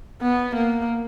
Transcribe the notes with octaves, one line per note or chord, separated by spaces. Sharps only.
B3
A#3